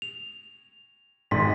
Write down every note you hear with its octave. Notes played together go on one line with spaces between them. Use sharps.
F7
G#1 C6 B6